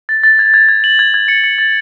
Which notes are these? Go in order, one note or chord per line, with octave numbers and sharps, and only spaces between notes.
A6
A6
G#6
G#6
G#6
F#7
G#6
G#6
C#7
C#7
A6